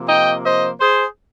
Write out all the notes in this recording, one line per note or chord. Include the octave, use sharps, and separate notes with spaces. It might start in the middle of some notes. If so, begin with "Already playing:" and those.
Already playing: C3 F3 A#3
D#5 G5
C5 D#5
G#4 C5